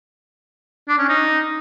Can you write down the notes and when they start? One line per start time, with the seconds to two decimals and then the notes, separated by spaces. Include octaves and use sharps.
0.88 D4
0.99 C#4
1.09 D#4